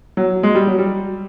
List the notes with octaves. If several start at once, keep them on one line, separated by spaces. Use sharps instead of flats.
F#3
G#3
G3
F#3
G3